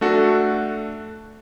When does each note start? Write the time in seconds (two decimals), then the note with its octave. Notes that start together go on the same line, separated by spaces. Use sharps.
0.01 A3 D4 F#4 A4